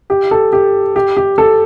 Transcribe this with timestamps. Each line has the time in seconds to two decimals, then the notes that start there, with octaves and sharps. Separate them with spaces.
0.10 G4
0.31 A4
0.53 G4
0.96 G4
1.17 G4
1.38 A4